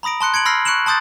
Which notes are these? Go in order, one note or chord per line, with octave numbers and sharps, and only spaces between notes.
A#5 B5 D#6 A#6 D7
A5 C6 F#6 C#7
G#6 C#7 D7 F#7
B5 C6 E6 F6 A#6 C7
C#6 F#6 C#7 D7 E7 F#7
A5 C6 D#6 G6 A6